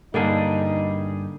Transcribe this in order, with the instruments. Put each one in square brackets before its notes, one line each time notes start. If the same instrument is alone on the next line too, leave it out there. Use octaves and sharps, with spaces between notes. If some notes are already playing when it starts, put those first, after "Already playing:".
[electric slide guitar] G2 G3 G#4 [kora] D3 A#3 [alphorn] D#4